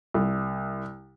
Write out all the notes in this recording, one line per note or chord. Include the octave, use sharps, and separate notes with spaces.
C2